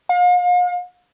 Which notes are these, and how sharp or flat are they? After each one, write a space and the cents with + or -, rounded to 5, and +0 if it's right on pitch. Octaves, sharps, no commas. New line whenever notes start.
F5 +45